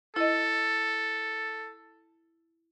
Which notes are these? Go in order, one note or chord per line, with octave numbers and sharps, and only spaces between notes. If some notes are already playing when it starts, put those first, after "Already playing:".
E4 A4 D#5